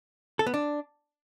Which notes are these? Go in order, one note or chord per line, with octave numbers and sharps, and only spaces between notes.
A4
B3
D4